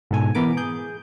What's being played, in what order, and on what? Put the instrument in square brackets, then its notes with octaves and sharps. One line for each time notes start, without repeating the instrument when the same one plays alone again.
[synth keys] G#2 B2 A4 G#5
E3 B3 A#4 D6
G#4 G6